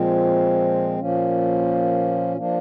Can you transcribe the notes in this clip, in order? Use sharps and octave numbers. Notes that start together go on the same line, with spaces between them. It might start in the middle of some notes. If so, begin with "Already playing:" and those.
Already playing: A#2 F3 G#3 C4
A#2 F3 A#3 C#4
F3 A#3 D4